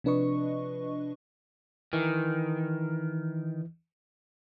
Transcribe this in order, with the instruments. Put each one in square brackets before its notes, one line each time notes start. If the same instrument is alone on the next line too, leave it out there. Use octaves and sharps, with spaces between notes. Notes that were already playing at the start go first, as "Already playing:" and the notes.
[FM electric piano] C3 F3 D4 B4 D#5 C#6
[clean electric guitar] D#3 [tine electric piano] E3